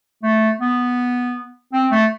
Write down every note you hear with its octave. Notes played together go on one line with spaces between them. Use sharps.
A3
B3
C4
A3